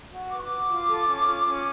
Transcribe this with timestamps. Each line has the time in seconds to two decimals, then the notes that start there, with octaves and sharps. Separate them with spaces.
0.11 F#4
0.30 B4 D6
0.37 C#6
0.44 D6
0.49 F#4
0.69 F4
0.88 A4
1.08 C#4
1.27 F4
1.46 C#4